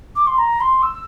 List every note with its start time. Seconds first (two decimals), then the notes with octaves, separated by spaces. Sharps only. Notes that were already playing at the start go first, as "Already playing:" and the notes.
0.15 D6
0.26 C6
0.38 A#5
0.60 C6
0.82 E6